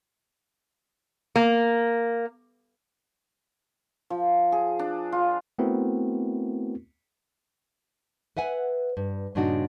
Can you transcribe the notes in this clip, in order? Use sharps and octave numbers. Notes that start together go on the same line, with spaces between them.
A#3
F3
G#4
D4
F4
A3 B3 C4 E4 F#4 A#4
B4 E5 F#5 G#5
G2
G2 A#2 C#3 D4 D#4 F#4